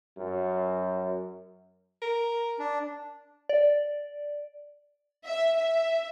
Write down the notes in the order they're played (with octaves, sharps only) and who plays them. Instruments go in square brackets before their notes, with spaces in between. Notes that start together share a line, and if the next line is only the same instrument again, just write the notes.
[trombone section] F#2
[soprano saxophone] A#4
[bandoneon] D4
[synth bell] D5
[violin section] E5
E5